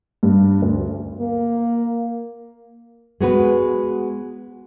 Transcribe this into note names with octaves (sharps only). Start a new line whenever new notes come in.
G2
D2
A#3
G#3 B3 F#4 B4